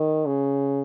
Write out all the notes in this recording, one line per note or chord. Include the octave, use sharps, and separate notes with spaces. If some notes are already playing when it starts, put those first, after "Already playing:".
Already playing: D#3
C#3